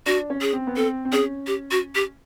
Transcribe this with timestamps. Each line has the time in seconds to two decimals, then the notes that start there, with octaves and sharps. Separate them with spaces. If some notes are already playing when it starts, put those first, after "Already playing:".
0.06 D4 F#4
0.30 C#4
0.41 G#4
0.53 C4
0.67 B3
0.76 C4 A4
1.05 C4
1.13 C#4 G#4
1.47 G4
1.71 F#4
1.95 G4